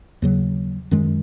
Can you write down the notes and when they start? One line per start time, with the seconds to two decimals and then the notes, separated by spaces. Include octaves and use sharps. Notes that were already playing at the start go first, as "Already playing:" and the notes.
0.22 D#2 C#3 F#3
0.91 F#2 D#3 G#3